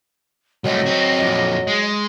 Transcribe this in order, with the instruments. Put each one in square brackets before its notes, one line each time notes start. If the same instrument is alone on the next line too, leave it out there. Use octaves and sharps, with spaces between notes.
[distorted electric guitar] C2 A3 [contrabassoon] F#3 [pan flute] D#5
[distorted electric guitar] C4 F#4
F2 A#2
G#3